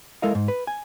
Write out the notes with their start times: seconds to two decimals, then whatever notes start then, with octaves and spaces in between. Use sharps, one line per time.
0.22 G#3 E4 A4 A#4 D#5 F5
0.35 G#2
0.48 B4
0.67 G#5